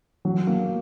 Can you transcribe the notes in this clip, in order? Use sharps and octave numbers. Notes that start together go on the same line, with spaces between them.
F#3
A#3